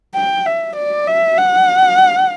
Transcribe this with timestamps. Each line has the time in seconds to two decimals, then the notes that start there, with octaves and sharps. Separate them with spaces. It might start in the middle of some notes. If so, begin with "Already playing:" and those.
0.15 G5
0.45 E5
0.76 D5
1.07 E5
1.38 F#5